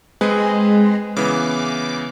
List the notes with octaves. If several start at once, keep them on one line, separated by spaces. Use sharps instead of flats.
G#3 C4 G#4 B4
C#3 E3 B3 D6